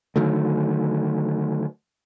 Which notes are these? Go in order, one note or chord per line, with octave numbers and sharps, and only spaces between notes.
D3 D#3 F#3 A3